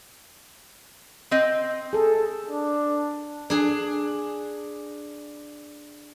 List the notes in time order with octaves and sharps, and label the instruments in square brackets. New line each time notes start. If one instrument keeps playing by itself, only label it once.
[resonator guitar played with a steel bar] C4 D#5
[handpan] G#4 A4
[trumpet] D4
[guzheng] D4 G#4